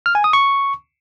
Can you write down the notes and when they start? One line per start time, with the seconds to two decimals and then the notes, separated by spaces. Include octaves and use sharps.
0.06 F6
0.15 G#5
0.24 D#6
0.33 C#6